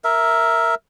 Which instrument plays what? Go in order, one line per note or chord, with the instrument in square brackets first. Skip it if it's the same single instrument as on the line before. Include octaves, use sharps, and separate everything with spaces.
[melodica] A#4 E5